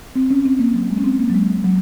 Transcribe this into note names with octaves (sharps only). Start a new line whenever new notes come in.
C4
C#4
C4
A#3
F#3
G#3
C#4
C4
A#3
F#3
G#3
F#3